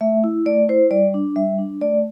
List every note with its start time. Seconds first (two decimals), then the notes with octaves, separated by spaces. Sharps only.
0.01 A3 E5
0.24 E4
0.46 A3 D5
0.69 E4 C5
0.91 G3 D5
1.14 D4
1.36 G3 E5
1.58 D4
1.81 A3 D5